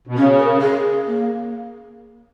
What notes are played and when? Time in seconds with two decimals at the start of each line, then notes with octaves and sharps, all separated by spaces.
0.07 B2
0.17 C#3 C#4
0.39 A#4
0.61 G#4
1.07 A#3